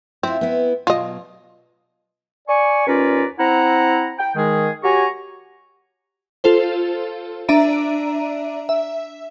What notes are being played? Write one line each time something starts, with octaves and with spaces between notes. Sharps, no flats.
C4 E4 F4
B3 E4
B2 F#3 F4 D#5
D5 G#5 C#6
D#2 C#4 F4 B4 D5 A#5
C4 E4 F#5 A#5
G5
D#3 G#3 G#4
F#4 G4 C#5 G#5 A#5 C#6
F4 A4 C5
D4 D5 E5 A#5 D7 D#7
E5